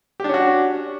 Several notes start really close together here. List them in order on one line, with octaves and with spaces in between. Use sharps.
G4 D4 C#4 F#4